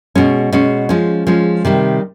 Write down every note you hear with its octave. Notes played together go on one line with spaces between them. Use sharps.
B2 G#3 C#4
B2 G#3 C#4
F3 G#3 C#4
F3 G#3 C#4
C3 D#3 G3